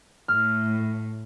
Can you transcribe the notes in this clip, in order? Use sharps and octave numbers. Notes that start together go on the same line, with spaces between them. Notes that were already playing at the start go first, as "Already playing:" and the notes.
A2 F6